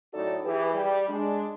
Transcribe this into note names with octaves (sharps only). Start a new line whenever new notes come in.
F#2 A2 D#4 F#4 A4 D5
E3 G4 G#4 B4
G3
G#3 D4